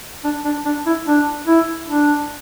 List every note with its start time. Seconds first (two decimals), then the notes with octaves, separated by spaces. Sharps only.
0.24 D4
0.45 D4
0.66 D4
0.86 E4
1.07 D4
1.47 E4
1.88 D4